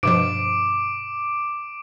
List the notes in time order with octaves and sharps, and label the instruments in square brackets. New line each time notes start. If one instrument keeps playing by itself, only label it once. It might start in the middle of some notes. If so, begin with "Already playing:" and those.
[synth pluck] G2 B2 F3 [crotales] D6 D7